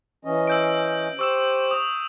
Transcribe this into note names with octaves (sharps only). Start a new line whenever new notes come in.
E3 C#4 D#5
E6 G6 D7
G4 C5 C#6 E6 E7
C#6 D#6